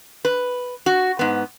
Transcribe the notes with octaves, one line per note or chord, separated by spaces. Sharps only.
B4
F#4
G#2 B3